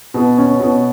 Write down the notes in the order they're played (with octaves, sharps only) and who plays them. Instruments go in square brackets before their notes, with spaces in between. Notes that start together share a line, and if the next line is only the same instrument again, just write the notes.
[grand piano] B2
C#4
B2